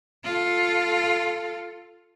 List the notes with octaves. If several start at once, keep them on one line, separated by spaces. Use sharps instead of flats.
F4 A4